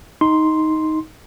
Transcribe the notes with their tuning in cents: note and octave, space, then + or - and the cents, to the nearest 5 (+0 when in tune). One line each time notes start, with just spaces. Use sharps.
D#4 +10 C6 +0